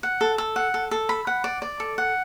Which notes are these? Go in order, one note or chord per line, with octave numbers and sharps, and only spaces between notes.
F#5
A4
A4
F#5
A4
A4
B5
F#5
D5
D5
A4
F#5